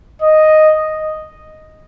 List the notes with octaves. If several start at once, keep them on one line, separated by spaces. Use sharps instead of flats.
D#5